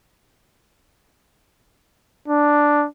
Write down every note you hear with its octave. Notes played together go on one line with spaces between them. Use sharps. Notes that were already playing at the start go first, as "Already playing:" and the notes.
D4